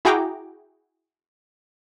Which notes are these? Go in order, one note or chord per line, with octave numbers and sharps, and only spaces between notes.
E4 F#4 G#4 G5 A#5 D6